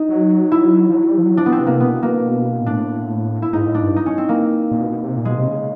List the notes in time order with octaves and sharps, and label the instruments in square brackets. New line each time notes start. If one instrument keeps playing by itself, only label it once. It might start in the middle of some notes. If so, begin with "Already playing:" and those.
Already playing: [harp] D#4
[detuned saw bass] F#3
[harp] E4
[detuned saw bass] F3
F#3
G3
F3
F#3
[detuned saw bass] F3 [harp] D4
[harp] B3
C4
[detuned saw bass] C3
[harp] A#3
[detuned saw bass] B2 [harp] B3
[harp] A#3
[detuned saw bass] A#2
[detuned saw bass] A2 [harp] D4
[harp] E4
[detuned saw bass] G#2 [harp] D#4
[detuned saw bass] A2
[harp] D4
[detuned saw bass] G2
[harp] D#4
C#4
C4
A#3
[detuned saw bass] A#2
B2
C3
A#2
[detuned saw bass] B2 [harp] G#3
[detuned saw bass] C3
C#3